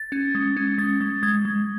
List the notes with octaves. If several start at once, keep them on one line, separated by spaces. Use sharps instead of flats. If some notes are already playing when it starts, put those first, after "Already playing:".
Already playing: A6
C#4
G#3
C#4
G#3 A6
G#3
G#3 G#6
G#3